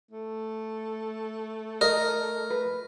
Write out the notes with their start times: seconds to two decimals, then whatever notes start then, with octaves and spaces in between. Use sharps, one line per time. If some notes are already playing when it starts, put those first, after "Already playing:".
0.11 A3
1.81 A#4 D#5
2.50 B4